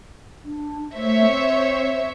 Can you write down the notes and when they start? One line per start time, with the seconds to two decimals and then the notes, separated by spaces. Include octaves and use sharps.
0.45 D4
0.95 A3 C5 C#5 E5
1.26 C4